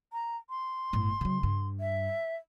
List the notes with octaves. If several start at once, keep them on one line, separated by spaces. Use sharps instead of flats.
A#5
C6
G1 A2
C#3 F#3
G2
E5